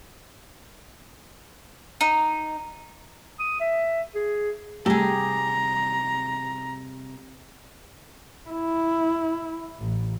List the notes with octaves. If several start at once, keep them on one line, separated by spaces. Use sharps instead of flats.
D#4
D#6
E5
G#4
C3 G3 A3 G4 G#4 A#5
E4
A1